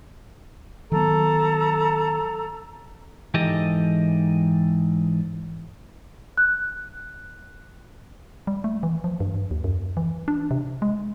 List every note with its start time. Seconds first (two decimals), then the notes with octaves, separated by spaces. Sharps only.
0.92 D#3 F#3 B3 A4 A#5
3.34 G#2 E3 D#4 G4 A4 D#5
6.38 F#6
8.47 G3
8.64 A3
8.83 E3
9.04 F3
9.20 G2
9.51 D#2
9.64 F#2
9.97 E3
10.28 D4
10.51 C3
10.82 G#3